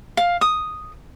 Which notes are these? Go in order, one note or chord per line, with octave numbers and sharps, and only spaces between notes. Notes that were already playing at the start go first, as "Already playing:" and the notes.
F5
D#6